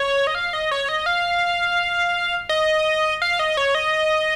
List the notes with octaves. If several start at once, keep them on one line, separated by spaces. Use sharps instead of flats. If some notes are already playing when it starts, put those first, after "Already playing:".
Already playing: C#5
D#5
F5
D#5
C#5
D#5
F5
D#5
F5
D#5
C#5
D#5